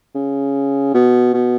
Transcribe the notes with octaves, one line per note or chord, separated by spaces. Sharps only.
C#3
B2
B2